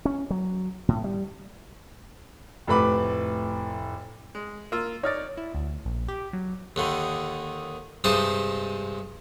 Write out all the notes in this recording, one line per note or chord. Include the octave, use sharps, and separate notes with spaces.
C#4
F#3
A2
G3
F1 A2 B4 B5 D6
G#3
A#3 F4 E6
D#4 C#5 D5 F6 A6
E4
D2
A#1
G4
F#3
D#2 D3 D#3
G2 C3 G#3 D#4 C5 A5